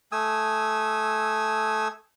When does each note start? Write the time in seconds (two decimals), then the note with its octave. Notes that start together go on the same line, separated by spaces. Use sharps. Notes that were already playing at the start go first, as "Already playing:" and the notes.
0.12 A3 G#5 D#6 E6